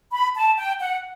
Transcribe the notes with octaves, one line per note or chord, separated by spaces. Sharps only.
B5
A5
G5
F#5